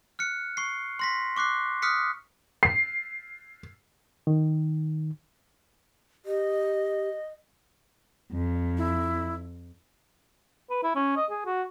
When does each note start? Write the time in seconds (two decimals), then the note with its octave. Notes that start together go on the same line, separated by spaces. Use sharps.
0.19 F6 F#6 C#7
0.57 C#6 C7
0.99 C6 A#6 B6
1.36 C#6 D6 F#6 C7
1.82 D#6 F6 F#6 B6 C#7
2.63 C7
4.27 D#3
6.26 G4 D#5
8.32 F2
8.77 E4
10.70 B4
10.84 E4
10.96 C#4
11.17 D#5
11.31 G#4
11.46 F#4